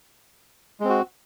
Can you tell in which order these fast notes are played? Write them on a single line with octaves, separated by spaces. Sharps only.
G#3 C4 F#4